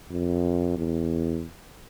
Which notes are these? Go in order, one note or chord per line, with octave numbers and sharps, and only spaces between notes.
F2
E2